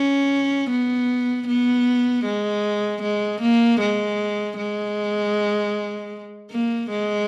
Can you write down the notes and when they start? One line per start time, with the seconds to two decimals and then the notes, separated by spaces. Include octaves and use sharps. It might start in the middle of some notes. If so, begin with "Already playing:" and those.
Already playing: C#4
0.70 B3
1.48 B3
2.25 G#3
3.03 G#3
3.42 A#3
3.81 G#3
4.58 G#3
6.51 A#3
6.91 G#3